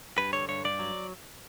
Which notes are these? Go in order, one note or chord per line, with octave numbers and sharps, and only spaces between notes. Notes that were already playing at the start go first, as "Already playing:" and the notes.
G2 B4
D3 C#5
G2 C#5
G2 D5
F#3